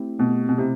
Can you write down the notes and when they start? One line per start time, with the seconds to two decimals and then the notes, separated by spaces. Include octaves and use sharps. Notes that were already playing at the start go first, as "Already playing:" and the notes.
Already playing: A3 C4 E4 G4
0.19 B2 A3
0.49 B2
0.58 C3 E4 G4